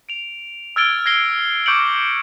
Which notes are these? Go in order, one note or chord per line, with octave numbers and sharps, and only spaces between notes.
D7 F7
E6 F6 G#6 A6 D7 G7
G#6 A#6 C7 G7
C#6 D6 G6 C#7 D7 F#7